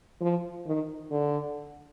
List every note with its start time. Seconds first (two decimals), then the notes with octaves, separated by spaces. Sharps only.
0.21 F3
0.66 D#3
1.11 D3